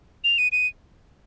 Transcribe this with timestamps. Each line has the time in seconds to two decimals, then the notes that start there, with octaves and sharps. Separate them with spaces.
0.24 F7
0.38 D#7
0.52 D#7